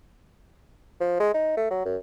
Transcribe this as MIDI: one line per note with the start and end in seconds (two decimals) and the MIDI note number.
1.00 1.17 53
1.20 1.30 56
1.34 1.56 63
1.57 1.69 57
1.70 1.82 54
1.85 1.97 42